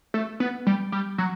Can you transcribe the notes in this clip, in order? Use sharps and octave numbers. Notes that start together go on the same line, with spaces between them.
A3
B3
G3
G3
F#3